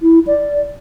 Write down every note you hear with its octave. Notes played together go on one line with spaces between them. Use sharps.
E4
D5